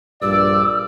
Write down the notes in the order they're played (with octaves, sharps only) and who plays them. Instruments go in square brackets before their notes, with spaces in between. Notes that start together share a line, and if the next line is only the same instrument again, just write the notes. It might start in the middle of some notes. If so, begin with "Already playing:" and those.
[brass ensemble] A#1 G2 D5 [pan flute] E6